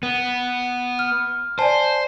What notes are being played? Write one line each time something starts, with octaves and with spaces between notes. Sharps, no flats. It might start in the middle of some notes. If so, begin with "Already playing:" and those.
B3
F6
C5 D5 G#5 A5